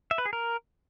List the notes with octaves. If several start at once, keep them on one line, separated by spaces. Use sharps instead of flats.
E5
B4
G#4
A#4